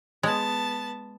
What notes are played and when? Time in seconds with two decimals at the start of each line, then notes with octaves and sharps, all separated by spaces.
0.23 G#3 B3 A5